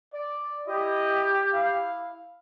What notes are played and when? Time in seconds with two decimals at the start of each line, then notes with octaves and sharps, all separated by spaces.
0.12 D5
0.67 E4 G4 D#5
1.52 E4 F5